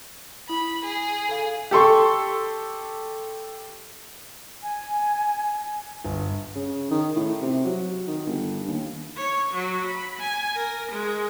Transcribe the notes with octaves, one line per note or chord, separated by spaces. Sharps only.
E4 B5
G#4
A4 F5
G4 A4 C6 C#6
G#5
G1
C#3
D#3
A2
C3
F#3
D#3
G1
D#2
C#5
F#3
B5
G#5
A#4
G#3